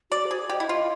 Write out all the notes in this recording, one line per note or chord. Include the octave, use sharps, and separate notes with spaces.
F#4 D5
C5
G#4
D5
G4 D#5
E4
F4 D#5